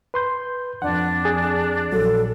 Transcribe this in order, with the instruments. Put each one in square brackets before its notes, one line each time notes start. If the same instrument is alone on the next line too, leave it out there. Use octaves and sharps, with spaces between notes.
[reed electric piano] B4 C6 G6
[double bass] F2 [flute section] D4 [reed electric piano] F#5
[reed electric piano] G#4
[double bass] A#1 [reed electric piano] F#3 [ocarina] A4